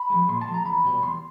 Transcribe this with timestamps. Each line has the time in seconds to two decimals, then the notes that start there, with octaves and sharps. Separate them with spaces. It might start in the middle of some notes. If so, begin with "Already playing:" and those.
Already playing: B5
0.10 F3 G#3
0.29 A#2 C6
0.41 A5
0.47 F3 G#3
0.54 A#5
0.65 E2 B5
0.84 B2 G3
1.02 E2 C6